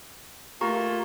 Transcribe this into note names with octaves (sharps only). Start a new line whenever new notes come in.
A3 A#3 F4 G4 A#5 C#6